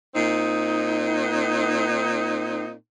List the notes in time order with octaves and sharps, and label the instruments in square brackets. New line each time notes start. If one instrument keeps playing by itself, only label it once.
[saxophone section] A#2 C4 D#4